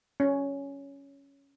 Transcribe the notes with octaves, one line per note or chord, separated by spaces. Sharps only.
C#4